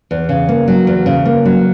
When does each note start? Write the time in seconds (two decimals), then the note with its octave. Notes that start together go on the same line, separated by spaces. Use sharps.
0.11 E2
0.29 C#3
0.49 A#3
0.68 F#3
0.87 E2
1.06 C#3
1.26 A#3
1.45 F#3